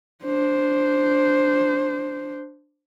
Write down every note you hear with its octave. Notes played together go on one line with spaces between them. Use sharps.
D4 C5